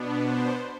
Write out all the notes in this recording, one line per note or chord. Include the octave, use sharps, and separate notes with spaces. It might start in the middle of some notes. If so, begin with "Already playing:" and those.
Already playing: B2 B3 D4
C5